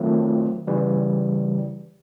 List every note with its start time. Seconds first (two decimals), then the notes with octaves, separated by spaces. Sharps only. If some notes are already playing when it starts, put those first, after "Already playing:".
Already playing: D#3 F#3 A3 C4 F4
0.67 C#3 E3 G3